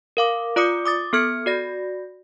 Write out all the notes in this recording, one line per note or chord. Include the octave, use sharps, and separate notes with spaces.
A#4 F5 D6
F4 D5 D6 D#6 C#7
D6 D#6 A6
B3 A4 F6 G#6 C#7
F#4 D5 A#6